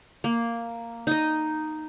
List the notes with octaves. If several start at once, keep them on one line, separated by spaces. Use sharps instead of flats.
A#3
D#4 D#5